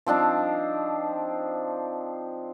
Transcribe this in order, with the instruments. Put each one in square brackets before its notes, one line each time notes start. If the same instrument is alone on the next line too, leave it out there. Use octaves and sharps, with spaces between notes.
[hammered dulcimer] F3 C4 D4 D#4